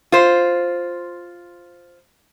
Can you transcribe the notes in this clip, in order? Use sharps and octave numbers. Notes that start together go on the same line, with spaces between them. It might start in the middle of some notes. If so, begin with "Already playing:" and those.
F4 C5